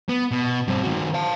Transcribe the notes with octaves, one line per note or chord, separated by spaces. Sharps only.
B3
B2
G2 C4
D#3 F#4
F5 A5